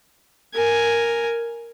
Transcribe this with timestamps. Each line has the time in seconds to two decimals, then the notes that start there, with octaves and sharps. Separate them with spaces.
0.54 A#4 G#5